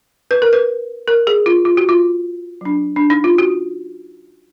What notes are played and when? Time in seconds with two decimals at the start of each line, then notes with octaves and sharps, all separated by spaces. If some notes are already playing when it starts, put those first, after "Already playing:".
0.31 B4
0.42 A#4
0.53 B4
1.08 A#4
1.27 G#4
1.46 F4
1.65 F4
1.77 F#4
1.89 F4
2.61 F#3 D4
2.96 D4
3.10 D#4
3.24 F4
3.38 F#4